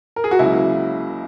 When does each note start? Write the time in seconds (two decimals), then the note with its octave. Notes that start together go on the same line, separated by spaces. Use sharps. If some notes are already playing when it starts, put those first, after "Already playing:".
0.16 A#4
0.24 G#4
0.31 F#4
0.39 C#2 C#3 F#3 A#3 E4